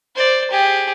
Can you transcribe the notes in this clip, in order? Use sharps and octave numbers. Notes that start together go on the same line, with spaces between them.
C5 D5
G4 G#4